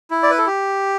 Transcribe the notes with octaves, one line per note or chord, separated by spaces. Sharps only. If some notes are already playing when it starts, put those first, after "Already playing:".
E4
D5
B4
A4
G4